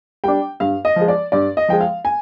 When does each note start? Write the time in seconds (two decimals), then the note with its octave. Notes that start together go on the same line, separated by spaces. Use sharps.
0.24 G3 D4 G5
0.60 G2 F5
0.85 D#5
0.96 F3 G#3
1.08 D5
1.32 G2 D5
1.57 D#5
1.68 F3 G#3 G5
1.81 F5
2.05 G#5